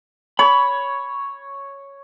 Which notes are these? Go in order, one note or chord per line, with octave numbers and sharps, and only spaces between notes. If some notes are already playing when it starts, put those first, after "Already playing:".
C#5 B5